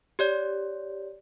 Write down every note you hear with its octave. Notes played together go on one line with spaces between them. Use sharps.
G4 C#5 D5